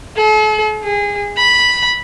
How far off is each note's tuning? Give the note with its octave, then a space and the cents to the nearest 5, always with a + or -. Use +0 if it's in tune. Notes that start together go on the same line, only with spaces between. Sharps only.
A4 -45
G#4 -25
B5 -5